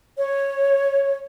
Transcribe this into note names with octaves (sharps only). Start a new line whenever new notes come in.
C#5